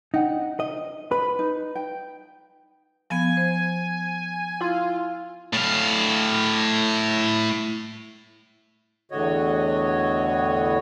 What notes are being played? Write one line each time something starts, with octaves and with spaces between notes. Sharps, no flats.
D4 D#4 F#5 G5
D#5
B4
D#4
G5
F3 B3 G#5
C5
E4 F4
A2 F5
E2 A2 D3 F#4 C#5 D#5